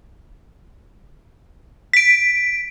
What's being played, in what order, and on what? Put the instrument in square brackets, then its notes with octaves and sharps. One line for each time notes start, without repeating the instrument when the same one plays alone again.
[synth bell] B6 D7